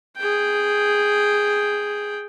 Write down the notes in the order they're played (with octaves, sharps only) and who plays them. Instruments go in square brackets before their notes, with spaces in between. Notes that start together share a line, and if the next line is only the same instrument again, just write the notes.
[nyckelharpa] G#4 G5